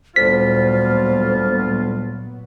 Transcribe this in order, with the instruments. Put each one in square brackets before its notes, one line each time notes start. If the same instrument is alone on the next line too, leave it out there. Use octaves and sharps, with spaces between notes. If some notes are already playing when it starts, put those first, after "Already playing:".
[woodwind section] D2 G3 F4 [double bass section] A#2 F#3 B3 [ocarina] C5 [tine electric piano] B6